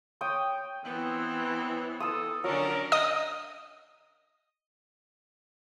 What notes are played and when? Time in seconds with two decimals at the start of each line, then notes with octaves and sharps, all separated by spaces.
0.21 C#5 G5 D#6
0.85 E3 B3 C4
2.00 A4 D#6 E6
2.44 D3 F#3 C#4 D4 A#4 D5
2.92 D#5 D#6